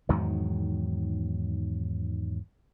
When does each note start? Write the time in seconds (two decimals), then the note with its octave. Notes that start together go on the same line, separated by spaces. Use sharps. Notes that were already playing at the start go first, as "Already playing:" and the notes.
0.09 E2 G#2 D#3 F#3